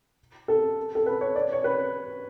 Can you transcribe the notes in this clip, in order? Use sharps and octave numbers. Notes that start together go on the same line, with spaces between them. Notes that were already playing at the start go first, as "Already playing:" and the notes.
A4
A4
B4
C#5
D5
C#5
B4